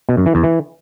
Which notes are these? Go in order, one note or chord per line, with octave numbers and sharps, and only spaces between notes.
B2
F#2
E3
E2
E3